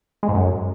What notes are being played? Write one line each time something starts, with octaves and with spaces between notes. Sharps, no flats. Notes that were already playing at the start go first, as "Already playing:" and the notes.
G#3
G#2
F#2